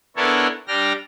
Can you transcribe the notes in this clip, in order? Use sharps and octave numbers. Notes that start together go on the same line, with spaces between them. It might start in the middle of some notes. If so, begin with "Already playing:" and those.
B3 D4 E4 A4 A#4 C#5
G3 D4 G5 F6 A#6